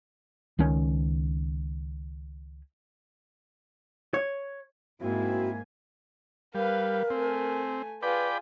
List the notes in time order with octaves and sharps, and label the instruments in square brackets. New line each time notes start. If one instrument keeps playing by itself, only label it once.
[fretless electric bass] C#2 D#3 C#4
[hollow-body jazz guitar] C#5
[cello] G#2 [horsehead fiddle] A#3 G#5 [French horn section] C4 E4 [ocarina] F#4
[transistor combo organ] G3 [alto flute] A#4 [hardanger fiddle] B4 F5
[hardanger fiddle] A3 G#5 [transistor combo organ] C4
[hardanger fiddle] F4 G#4 [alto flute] B4 [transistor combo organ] D5 G5 B5